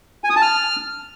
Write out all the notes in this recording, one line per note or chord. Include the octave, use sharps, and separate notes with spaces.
G#5
D#6
A5
F6